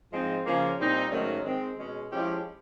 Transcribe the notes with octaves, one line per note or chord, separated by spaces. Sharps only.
G#2 F3 G#3 C4 D#4
C#3 F3 A#3 C#4
A#2 G3 C4 D#4
G#2 D#3 F#3 A3 C#4
D#3 G#3 C4
B2 G#3 C#4
F3 G#3 C#4 E4 G4